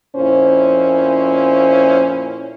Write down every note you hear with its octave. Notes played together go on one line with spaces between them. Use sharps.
F2 A#2 C#4 E4 C5